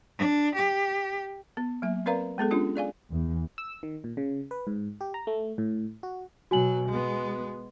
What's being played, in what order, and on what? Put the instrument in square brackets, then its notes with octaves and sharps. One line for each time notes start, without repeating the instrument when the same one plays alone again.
[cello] D4
G4
[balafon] B3
F#3 A#3 E5
C4 A#4 B4 D5 F5 A#5
G#3 B3 G#4 A4
C#4 D4 F4 G4
G#4 D5 F5 G#5
[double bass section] E2
[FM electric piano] E6
D#3
A#2
C#3
B4
G#2
G4
A#5
A3
A2
F#4
[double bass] B2 F#3 [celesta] F#4 G#5 F#7
[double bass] G#3 B3